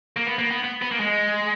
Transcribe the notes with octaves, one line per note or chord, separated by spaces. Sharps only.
A#3
B3
A#3
B3
B3
B3
A#3
G#3